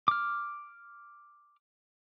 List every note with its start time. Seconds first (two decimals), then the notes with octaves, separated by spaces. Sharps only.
0.08 D6 F6